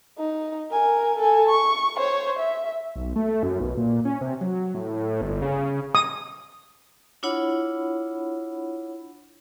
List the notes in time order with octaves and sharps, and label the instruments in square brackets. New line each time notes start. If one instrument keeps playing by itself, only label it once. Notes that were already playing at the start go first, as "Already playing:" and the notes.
[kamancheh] D#4
A#4 G#5
A4 G#5
C#6
C5 C#5
E5
[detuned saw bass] B1
A3
F#2
B1
A#2
C#4
C3
F#3
A2
G1
C#3
[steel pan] D#6
[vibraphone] D4 E4 F4 C#5 F#5 B5